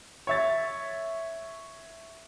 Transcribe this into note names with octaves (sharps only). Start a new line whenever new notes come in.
C#5 E5 A6